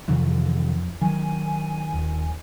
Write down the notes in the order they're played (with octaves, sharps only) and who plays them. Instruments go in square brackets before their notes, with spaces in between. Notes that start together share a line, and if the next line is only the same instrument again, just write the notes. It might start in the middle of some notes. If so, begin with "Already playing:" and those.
[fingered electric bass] F2 [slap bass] C3 D#3 E3
[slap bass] D#3 [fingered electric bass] F#3 [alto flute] G#5
[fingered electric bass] D#1 D#2